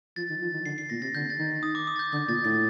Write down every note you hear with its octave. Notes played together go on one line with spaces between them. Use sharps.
F3 A6
D#3
F3
D#3
D3 C7
C7
A#2 A#6
C3 A6
D3 G6
A6
D#3
D#6
D6
D#6
A6
G6
D3 G6
A#2 A6
A2 A6